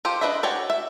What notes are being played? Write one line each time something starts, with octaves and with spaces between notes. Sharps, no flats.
F4 G4 A4 C5
D4 B4 C5 D#5 E5
F#4 C#5 D5 G5 G#5
E5